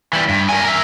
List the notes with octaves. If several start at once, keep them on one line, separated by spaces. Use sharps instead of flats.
E3 G3
G2
A#4 G#5
A#4 E5